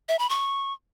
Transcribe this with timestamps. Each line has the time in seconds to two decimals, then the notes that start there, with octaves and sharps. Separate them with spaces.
0.09 E5
0.19 B5
0.29 C#6